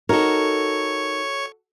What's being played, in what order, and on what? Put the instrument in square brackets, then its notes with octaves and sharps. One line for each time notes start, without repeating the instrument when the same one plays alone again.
[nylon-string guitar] D#4 A#4 [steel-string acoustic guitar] F#4 A4 [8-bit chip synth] C#5 C#6